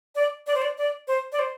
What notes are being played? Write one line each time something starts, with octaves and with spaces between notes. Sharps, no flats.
D5
D5
C5
D5
D5
C5
D5
C5